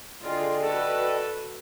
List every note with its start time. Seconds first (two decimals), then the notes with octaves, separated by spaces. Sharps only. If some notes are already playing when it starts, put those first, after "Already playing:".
0.24 D3 F4 G#4 D5 D#5 G5
0.64 F#4 A4 B4